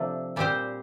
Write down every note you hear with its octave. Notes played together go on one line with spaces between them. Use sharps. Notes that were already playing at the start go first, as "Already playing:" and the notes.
Already playing: C3 F3 A3 D4
A#2 G3 C4 G4 C5